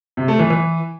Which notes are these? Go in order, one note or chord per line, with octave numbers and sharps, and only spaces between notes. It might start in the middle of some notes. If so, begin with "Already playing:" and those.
C3
A3
E3
E3